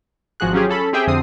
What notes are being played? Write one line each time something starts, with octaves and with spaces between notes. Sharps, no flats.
G#1 F3 F#4 G#4 F#6
F#3 C#4 F4 G4 G#4
C#4 A4 B5
C4 G4 G#4 E5 G5
F2 D3 C4 D#6 C7